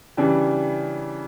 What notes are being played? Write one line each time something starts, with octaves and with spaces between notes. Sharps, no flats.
C#3 E3 G3 D4 G4